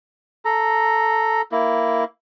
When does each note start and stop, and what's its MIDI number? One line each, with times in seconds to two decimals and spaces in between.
0.45 1.42 69
0.45 1.42 82
1.52 2.04 58
1.52 2.04 64